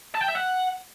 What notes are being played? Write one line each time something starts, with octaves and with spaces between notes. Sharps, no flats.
A5
G5
E5
F#5